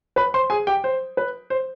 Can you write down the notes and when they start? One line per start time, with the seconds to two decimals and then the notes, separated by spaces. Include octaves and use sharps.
0.16 B4 B5
0.34 C5 C6
0.50 G#4 G#5
0.67 G4 G5
0.84 C5
1.17 B4
1.50 C5